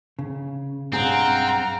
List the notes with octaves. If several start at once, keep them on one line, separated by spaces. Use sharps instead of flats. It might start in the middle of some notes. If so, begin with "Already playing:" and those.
C#3
B1 G2 C4 G#4 F5 F#5 A#5